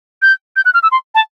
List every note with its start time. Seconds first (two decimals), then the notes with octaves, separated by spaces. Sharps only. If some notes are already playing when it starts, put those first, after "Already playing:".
0.22 G6
0.56 G6
0.65 F#6
0.74 F6
0.83 E6
0.92 C6
1.15 A5